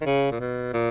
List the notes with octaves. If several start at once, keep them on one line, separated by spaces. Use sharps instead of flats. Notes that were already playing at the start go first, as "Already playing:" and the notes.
D#3
C#3
A#2
B2
A#2